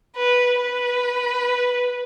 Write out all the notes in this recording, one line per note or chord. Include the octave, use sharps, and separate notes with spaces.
B4
B4